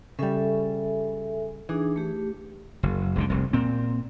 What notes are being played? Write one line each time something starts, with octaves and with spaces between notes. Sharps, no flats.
C#3 G3 A4 E5 G#5
E3 D4 D#4 G#4
A3 G4
F#1
F#1 C#2 D3
F1 C2
A#2 C4